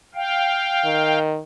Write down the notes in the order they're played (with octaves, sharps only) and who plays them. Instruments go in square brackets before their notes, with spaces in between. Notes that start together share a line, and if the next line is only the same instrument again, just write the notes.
[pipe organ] F5 G5
[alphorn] D#3